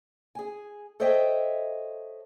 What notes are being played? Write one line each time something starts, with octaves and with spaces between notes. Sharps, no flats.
G#4 G#5
A4 C5 C#5 D#5 E5 G5